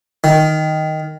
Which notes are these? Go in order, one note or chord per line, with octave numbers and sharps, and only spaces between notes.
D#3